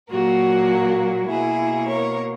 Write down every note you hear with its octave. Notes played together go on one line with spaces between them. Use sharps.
A#2 F#3 A#3 F#4 A#4
B2 A#3 E4 G#4
A#4 C#5